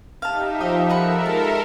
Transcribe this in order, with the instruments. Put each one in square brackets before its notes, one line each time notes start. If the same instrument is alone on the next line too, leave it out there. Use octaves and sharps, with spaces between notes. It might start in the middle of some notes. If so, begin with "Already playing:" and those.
[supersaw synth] D#4 G4 E5 [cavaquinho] F5 A5
[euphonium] F3 [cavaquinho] D#5
[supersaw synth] A4 A#4 E5 [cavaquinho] D#5 F#5 B5
[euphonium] G#3 [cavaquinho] A5